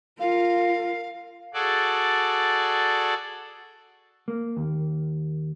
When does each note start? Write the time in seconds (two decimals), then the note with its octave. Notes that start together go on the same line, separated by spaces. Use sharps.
0.19 F4 A#4 F5
1.54 F#4 G#4 A4 D5
4.28 A#3
4.57 D#2